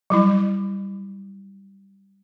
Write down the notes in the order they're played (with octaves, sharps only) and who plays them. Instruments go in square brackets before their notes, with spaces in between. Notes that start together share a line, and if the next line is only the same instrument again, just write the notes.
[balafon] F#3 G3 E4